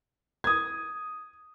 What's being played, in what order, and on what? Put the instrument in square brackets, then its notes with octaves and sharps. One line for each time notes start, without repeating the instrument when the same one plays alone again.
[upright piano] D#6 G#6